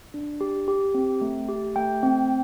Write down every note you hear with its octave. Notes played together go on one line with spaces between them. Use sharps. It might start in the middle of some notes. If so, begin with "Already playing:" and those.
D4
G4
G4
C4
A3
G4
A3 G5
C4